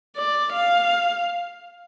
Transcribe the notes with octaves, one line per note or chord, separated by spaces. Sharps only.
D5
F5